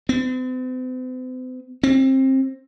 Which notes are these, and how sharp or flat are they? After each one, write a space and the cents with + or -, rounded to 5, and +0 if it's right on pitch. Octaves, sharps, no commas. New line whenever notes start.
C4 -45
C4 +25